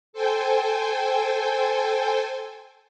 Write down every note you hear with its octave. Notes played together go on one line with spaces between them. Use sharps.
A4 C5 G5 G#5